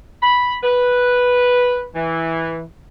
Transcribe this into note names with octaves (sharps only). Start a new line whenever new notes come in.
B5
B4
E3